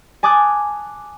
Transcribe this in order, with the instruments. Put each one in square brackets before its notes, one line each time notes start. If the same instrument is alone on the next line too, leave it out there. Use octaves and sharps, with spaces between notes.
[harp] G#5 A5 D6 D#6 F#6 G#6